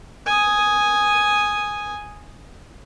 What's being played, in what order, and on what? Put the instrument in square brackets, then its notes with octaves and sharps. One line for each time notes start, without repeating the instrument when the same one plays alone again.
[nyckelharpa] G#5 D#6